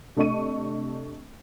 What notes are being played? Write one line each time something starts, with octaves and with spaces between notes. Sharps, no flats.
C3 A3 D4 D#5 C#6 D#7